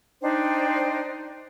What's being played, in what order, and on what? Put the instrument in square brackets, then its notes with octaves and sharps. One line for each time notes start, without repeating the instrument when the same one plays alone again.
[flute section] D4 D#4 C5 G5